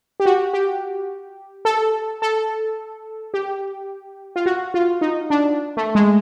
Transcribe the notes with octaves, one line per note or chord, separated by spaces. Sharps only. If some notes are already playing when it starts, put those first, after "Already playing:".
G4
F#4
G4
A4
A4
G4
F4
F#4
F4
D#4
D4
A3
G#3